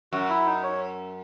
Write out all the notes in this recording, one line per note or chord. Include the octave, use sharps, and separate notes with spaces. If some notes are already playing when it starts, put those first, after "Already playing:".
F#2 F#4
E4
D#4
C#5